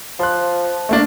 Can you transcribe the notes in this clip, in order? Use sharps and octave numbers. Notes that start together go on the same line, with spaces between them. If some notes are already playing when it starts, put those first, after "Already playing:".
F3 C6 F#6
A3 A#3 D4